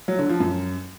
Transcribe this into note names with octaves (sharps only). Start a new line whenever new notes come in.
F#3
D3
F3
F#2